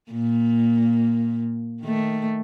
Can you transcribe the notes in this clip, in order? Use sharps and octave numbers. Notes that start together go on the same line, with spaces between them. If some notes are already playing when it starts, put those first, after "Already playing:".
A#2 A#3
D#3 A3